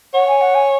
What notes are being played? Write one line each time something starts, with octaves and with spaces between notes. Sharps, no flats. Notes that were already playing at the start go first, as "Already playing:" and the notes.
C#5 F#5
G#5
F#5
G#5